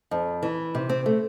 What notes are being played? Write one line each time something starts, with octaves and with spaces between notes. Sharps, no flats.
F2
E3
C3
C4
A3